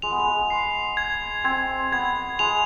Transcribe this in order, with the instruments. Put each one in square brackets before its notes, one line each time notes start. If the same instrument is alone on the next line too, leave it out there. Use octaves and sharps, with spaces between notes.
[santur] G#3 [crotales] F7
[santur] B3
G#3
[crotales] C7
G#6
[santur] C4 [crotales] G#6
[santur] B3 [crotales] G#6
[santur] G#3 [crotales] F7